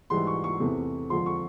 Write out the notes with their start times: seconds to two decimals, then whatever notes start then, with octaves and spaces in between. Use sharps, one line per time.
0.10 G#2 E3 G3 C6
0.27 C#6
0.44 C#6
0.60 E2 C3 E3 A3
1.10 F2 D3 F3 G#3 C6
1.26 C#6